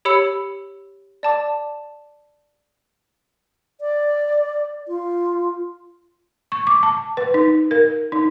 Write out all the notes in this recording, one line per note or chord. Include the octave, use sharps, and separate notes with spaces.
G4 C#5 B5 E6 C#7 F#7
D5 A5 D6
D5
F4
C#6
D6
A5
B4
D#4
A#4
D#4